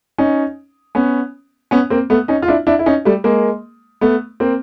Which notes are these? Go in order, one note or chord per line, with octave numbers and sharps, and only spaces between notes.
C#4 D#4
B3 C#4
B3 C#4
A#3 C4
A3 B3
C#4 D#4
F4
D4 E4
D4 E4
E4
C#4 D#4
G3 A3
G#3 A#3
A3 B3
A#3 C4